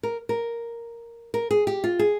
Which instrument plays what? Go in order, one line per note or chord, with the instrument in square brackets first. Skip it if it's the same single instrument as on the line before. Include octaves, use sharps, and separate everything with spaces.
[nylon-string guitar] A#4
A#4
A#4
G#4
G4
F4
G#4